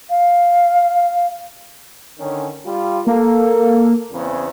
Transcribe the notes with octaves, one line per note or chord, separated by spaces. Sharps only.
F5
D3 D#3 C#4
G3 F4
A#3 A4
E2 C#3 C4